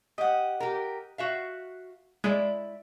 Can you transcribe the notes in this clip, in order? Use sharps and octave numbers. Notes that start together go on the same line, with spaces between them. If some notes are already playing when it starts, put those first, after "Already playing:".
G4 D#5 F#5
G4 A#4
F#4 E5 F5
G#3 E4 D5